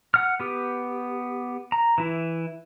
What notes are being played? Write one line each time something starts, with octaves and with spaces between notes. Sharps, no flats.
F#5 F6
B3 G4
A#5
E3 E4